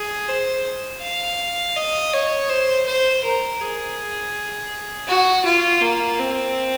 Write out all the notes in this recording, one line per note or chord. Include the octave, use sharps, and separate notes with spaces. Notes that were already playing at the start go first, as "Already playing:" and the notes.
Already playing: G#4
C5
F5
D#5
C#5
C5
C5
A#4
G#4
F#4
F4
A#3
C4